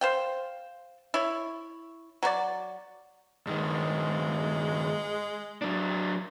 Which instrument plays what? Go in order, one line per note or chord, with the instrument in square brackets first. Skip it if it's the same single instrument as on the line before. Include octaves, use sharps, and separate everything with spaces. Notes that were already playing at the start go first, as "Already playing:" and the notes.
[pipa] C5 F5 G5
E4 C#5
F#3 F#4 B4 D5
[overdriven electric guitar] G2 D#3 [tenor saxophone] G#3
[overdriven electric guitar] F#3 D4